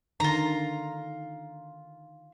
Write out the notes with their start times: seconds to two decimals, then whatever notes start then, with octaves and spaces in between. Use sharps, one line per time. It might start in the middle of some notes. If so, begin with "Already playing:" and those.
0.20 D3 D#3 F4 A#5